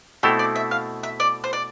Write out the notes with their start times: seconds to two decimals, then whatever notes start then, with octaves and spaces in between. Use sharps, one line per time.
0.23 B2 A3 C4 E4 G4 A4
0.39 D5
0.55 E5
0.71 F5
1.03 E5
1.20 D5
1.44 C5
1.53 D5